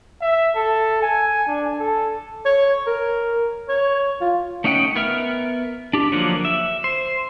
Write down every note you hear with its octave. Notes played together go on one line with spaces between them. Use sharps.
E5
A4
G#5
D4
A4
C#5
A#4
C#5
F4
A3 C#4 D#4 F#5 G5
B3 A#4 E5 F6
D4 G4
D3 F3 F#3 A#3 F#5
E5
C5